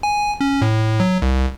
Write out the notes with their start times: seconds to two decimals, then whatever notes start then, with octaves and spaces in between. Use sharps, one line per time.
0.03 G#5
0.41 C#4
0.62 A2
1.00 F#3
1.22 C2